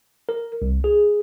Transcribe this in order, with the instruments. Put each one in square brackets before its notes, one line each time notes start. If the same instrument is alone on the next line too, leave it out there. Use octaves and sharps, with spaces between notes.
[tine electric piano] A#4
C2
G#4